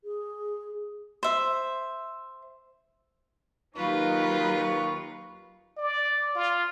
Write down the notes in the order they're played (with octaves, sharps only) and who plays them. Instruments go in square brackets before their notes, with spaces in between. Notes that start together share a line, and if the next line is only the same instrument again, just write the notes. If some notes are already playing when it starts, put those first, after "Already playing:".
[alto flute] G#4
[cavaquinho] C5 E5
[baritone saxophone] D#2 [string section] F#3 D#4 B4 [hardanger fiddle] F4 [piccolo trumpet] C#6
[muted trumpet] D5
F4